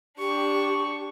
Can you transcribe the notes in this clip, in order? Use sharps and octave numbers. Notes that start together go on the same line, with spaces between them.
D4 G4 C#6